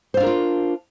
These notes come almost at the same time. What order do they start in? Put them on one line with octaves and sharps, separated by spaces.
C5 F5 D4 A#4 F4